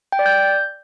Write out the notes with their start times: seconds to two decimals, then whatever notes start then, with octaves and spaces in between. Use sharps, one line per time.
0.12 G5
0.19 D5
0.26 G6